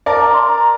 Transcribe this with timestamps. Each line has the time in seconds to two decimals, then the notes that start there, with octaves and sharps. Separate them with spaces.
0.06 A#4 D5 A5
0.21 A#5
0.33 C6
0.47 A#5